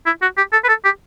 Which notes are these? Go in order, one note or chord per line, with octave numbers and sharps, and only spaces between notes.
E4
F#4
G4
A4
B4
A4
G4